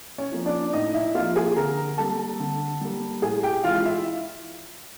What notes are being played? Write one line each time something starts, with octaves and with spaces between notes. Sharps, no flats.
C#4 C#5
F3 A#3
D4 D5
A2 D#4 D#5
E4 E5
F3 A#3 F4 F5
G#4 G#5
D3 A#4 A#5
G3 A#3 A4 A5
D3
G3 A#3
A2 G#4 G#5
G4 G5
E3 G#3 F4 F5
E4 E5